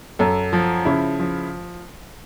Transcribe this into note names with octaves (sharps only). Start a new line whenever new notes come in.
F#2 A4
F3
C#3 E4
F3